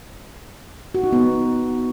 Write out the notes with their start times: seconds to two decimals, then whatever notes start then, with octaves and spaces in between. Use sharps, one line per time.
0.95 F#4
1.04 D#4
1.13 B3